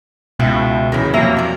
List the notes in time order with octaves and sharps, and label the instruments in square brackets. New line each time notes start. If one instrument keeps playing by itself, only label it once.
[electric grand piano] C#2 [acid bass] B2 [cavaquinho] E4 E5 F5
[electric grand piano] D#2 C#3 E3 [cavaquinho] A#4 B5
[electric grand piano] F2 C3 F#3 [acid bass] A#3 [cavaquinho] C#5 E5 A#5
[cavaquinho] D5 A#5